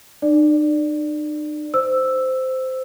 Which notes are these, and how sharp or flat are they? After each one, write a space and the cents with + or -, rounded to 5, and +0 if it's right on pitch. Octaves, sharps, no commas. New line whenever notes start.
D#4 -45 D5 +0
C5 -10 E6 +0